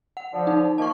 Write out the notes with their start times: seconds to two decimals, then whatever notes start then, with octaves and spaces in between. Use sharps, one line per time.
0.17 F#5
0.33 D3 F3
0.47 D#4
0.78 D#3 F3 A#3 A5 C#6